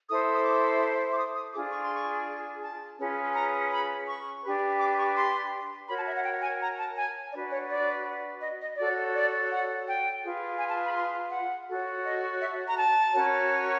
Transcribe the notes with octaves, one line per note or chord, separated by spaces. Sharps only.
E4 A4 C5 D#6
D#6
D6
D6
D#6
D#6
D4 F4 G#4 D6
C#6
C6
C#6
A5
C#4 F4 G#4 B4
A#5
B5
C#6
D4 G4 B4
D6
C#6
C6
F#4 A#4 C#5 B5
A5
E5
F#5
G5
G#5
A#5
A5
G#5
D4 F#4 B4 D5
C#5
D5
D#5
D#5
F#4 A4 C#5 D5
D5
F#5
G5
F4 G#4 B4
G#5
A5
B5
C6
F#5
F#4 A4 C#5
D#5
E5
A#5
A5
C#4 F#4 A#4 C#5